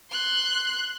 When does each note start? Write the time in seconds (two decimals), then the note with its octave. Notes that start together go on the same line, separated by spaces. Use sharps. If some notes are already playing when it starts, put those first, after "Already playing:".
0.11 C6 F#6